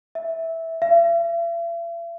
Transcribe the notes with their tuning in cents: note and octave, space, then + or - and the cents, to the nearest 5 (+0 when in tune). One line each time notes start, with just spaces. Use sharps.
E5 -10
E5 +45